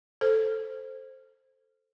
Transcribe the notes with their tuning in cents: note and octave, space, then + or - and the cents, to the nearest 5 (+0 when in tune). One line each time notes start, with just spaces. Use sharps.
A4 +0 C5 +0